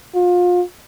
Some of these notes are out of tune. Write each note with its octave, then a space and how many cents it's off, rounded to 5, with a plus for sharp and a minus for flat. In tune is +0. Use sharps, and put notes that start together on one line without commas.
F4 +30